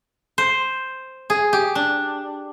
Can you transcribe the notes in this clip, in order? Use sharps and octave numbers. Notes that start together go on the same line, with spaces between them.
C5
G#4
G4
D4